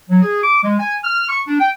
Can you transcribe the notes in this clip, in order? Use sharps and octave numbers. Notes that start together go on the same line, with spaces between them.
F#3
G#4
D6
G#3
G#5
F6
C#6
D4
G5